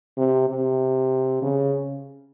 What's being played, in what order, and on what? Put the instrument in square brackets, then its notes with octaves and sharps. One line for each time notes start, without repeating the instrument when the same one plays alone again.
[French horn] C3
C3
C#3